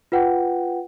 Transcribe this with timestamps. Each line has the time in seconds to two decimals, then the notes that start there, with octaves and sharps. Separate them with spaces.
0.12 F4 B4 F#5 G5